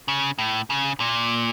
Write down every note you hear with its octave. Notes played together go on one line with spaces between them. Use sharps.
C#3
A2
C#3
A#2